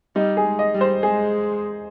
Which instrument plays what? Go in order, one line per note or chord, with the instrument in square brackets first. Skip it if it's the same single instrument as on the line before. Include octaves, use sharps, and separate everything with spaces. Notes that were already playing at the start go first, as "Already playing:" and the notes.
[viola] G3 [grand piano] D#4
[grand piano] G#4
[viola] G#3
[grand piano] D#5
[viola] G3
[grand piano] C5
[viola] G#3 [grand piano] G#4